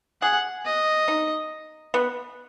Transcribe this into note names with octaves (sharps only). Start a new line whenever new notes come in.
G#4 F#5
D#5
D#4
B3